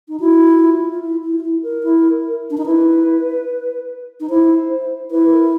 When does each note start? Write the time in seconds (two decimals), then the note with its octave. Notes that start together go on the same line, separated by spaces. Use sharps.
0.09 D#4
0.20 E4 F#4
0.61 F4
0.92 F4
1.02 E4
1.23 E4
1.38 F4
1.43 E4
1.63 A#4
1.83 E4
2.50 D4
2.58 D#4
2.65 E4 B4
4.20 D#4
4.29 E4 C5
5.11 E4 B4
5.32 A#4